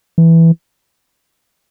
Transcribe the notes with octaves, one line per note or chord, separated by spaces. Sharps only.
E3